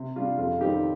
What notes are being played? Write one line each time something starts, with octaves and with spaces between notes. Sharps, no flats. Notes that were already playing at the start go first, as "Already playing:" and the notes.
Already playing: C3
G3 D4 F4
F2 F4
D#3 G3 C4 D#4 G4